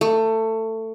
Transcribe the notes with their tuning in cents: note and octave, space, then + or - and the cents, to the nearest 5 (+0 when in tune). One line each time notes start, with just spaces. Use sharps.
A3 +20